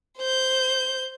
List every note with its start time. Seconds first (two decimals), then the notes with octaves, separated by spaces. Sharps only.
0.18 C5 G6